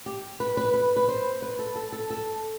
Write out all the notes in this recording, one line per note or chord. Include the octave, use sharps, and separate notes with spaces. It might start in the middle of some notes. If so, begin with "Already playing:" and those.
G4
B4
B4
B4
B4
C5
B4
A4
A4
A4
A4